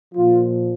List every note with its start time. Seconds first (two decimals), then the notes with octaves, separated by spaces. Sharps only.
0.15 A#2 F3 F4